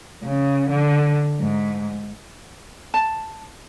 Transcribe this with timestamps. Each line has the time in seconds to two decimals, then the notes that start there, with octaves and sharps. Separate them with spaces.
0.23 C#3
0.70 D3
1.40 G#2
2.94 A5